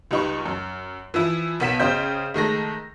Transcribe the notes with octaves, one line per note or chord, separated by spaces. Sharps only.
C#2 G3 D#4 B4 C#6
F#2
E3 F3 E4
B1 B3 B6 E7
C#3 C5 D#5 G5 G6 B6
D#3 G#3 A3 A#6